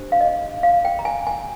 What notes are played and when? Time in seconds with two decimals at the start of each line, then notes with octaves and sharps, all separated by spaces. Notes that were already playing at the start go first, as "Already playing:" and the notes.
Already playing: D4 G4 C5
0.12 F5
0.20 D#5
0.63 F5
0.85 G5
0.99 A#5
1.05 G#5
1.27 G#5